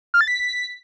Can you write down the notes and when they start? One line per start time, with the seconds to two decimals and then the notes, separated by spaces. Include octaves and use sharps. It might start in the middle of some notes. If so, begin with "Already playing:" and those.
0.14 F6
0.21 A6
0.28 B6